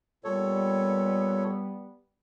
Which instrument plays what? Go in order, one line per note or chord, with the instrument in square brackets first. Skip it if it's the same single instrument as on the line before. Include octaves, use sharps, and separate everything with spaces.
[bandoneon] A#2 A4 C#5 [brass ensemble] G3 B3